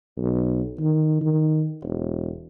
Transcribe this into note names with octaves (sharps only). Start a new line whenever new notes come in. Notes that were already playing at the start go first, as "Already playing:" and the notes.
B1
D#3
D#3
E1